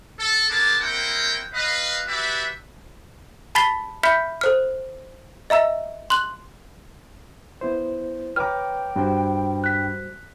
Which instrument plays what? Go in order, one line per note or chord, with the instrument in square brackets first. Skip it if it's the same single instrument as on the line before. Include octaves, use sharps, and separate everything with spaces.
[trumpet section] A4
B3 D4 G#4 A#4 A5 D6
A#3 C4 E4 A#4 F#5 G5
B4 D#5 F5
F#4 G4 B4 D5 E5
[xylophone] A5 B5 A6 B6 C7 G7
E5 B5 F6 G6 B6 C#7
A4 C5 F6
D#5 E5 A#5 E6
C6 F#6 F#7
[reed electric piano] B3 E4 C5
[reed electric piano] B4 D6 [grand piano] C#5 A#5 [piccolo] G5 [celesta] F6
[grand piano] G2 [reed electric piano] G3 F#4 C5
[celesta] F#6 B6